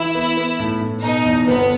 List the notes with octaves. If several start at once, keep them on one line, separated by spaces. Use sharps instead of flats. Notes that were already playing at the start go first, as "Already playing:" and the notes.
Already playing: E3 E4
B3
B3
A2
A2
B2 D#4
E2
G1 B3